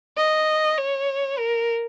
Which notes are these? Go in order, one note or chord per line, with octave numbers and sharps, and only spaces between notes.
D#5
C#5
A#4